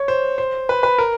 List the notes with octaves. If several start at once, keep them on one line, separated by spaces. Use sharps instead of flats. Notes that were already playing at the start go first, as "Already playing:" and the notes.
Already playing: C#5
C5
C5
B4
B4
A#4